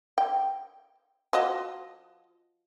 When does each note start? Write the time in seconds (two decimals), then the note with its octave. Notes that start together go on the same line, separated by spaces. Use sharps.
0.18 G5
1.33 F3 F#4 D#5